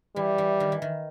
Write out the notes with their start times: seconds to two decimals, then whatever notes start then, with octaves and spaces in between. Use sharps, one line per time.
0.16 E3 G3
0.38 E3
0.60 D#3
0.72 E3
0.82 D#3